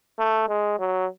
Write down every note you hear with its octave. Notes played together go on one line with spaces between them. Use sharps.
A3
G#3
F#3